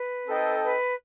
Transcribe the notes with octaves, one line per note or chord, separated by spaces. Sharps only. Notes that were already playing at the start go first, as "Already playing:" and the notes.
Already playing: B4
C4 D#4 A4 D#5 G5
B4